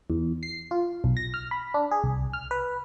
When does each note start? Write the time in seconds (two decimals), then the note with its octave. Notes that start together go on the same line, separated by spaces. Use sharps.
0.10 E2
0.43 C7
0.71 F4
1.04 B1
1.17 A#6
1.34 F6
1.51 B5
1.74 D4
1.91 G#4
2.04 C2
2.33 F6
2.51 B4